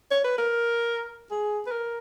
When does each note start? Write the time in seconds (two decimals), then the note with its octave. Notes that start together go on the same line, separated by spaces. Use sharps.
0.11 C#5
0.24 B4
0.38 A#4
1.31 G#4
1.66 B4
1.71 A#4